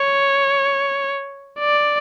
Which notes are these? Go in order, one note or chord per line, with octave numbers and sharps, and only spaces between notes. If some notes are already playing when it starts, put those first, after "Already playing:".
Already playing: C#5
D5